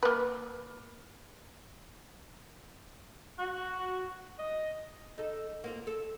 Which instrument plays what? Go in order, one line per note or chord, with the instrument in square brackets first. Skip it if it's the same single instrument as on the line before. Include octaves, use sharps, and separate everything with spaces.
[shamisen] A#3 B4
[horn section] F#4
D#5
[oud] D#4 A4
A#3 C4 F4
A4